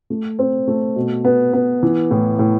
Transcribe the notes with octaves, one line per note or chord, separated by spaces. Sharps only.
A3
C4
A3
B2
B3
B3
E3
A2
A2